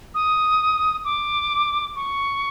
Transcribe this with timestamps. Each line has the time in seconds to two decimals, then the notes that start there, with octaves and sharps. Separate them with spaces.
0.14 D#6
1.04 D6
1.96 C#6